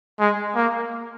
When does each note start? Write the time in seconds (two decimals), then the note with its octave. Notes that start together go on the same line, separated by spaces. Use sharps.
0.20 G#3
0.55 A#3